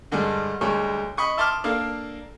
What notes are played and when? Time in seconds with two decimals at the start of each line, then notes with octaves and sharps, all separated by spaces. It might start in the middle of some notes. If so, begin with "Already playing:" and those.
0.12 G2 D3 G3 G#3
0.61 D2 G3 G#3 C#5
1.17 D#5 B5 C#6 D#6
1.37 E5 A5 C6 D6 D#6 F6
1.64 A#3 D4 A4 F5